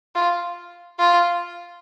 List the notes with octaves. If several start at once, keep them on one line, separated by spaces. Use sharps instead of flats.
F4
F4